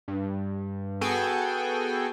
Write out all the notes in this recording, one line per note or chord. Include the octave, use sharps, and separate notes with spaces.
G2
B3 F#4 G#4 A4 G5 G#5